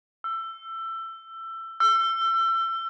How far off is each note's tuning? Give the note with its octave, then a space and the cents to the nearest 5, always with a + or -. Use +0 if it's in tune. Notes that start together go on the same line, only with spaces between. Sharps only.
E6 +20
E6 +30